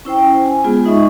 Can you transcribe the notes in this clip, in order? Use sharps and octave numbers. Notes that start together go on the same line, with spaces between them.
C#4 E4 C5 G5
G#5
G#3 B3 F4 G#4
G#3 D#4 D#5 E5 C#6